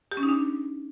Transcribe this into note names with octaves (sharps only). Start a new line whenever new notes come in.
G4
C#4
D#4
D4